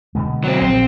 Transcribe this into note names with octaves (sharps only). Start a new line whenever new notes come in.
B2 D3 G#3
F#3 C4
A#1 C4